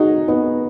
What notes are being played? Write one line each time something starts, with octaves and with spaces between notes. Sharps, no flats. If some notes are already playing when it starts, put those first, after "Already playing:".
Already playing: D#4 F#4 G#4
B3 D#4